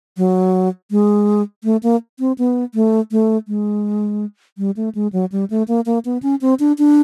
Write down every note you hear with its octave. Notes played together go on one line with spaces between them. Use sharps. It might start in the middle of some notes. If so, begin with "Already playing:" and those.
F#3
G#3
A3
A#3
C4
B3
A3
A3
G#3
G3
A3
G#3
F#3
G3
A3
A#3
A#3
B3
C#4
C4
D4
D4